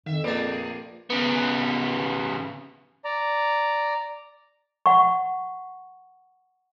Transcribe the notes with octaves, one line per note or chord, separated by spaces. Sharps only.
F2 D#3 E5
A#1 A3 G#4 B4 D5 A5
C#3 B3
D5 A#5
F#5 C#6